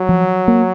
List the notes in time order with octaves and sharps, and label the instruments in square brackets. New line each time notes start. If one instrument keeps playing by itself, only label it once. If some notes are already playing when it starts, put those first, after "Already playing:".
Already playing: [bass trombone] F#3
[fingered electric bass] F3
A#3